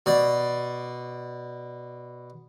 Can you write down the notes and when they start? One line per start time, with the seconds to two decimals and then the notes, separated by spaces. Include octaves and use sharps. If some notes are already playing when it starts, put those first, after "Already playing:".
0.06 B2 D5